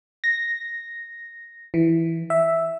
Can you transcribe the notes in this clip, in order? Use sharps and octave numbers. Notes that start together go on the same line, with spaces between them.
A#6
E3
E5